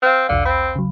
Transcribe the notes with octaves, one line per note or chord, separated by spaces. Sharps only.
C4 F5 F6
B1 E2 D3 F5
C4 B5
C#3 F#3